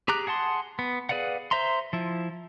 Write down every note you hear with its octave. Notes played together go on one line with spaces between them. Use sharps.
G4 G#4 A#5 D6 F#6
G#4 F#5 A5 C6
B3
G#4 B4 D5 F5 F#5
C5 E5 A#5 C6
F3 E4